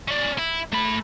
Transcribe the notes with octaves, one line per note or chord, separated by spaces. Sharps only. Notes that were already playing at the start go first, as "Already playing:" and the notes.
C#4 D5
E4
A3 B5